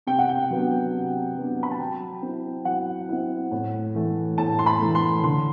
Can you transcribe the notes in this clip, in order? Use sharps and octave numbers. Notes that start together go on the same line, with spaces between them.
C3 G5
F#5
G5
F#3 B3 D4
C3
F#3 B3 D4
B5
A5
F#3 G5
C4 E4
F#3 F#5
C4 E4
A2
E3 A3
A2 A5
C6
B5
E3 A3
C6
D3 C6